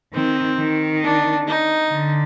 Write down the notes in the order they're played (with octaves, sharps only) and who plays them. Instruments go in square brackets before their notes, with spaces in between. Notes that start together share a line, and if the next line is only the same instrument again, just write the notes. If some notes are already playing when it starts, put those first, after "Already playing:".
[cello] D#3 [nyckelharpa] C4
[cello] D#3
[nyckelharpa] D4
D#4
[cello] D3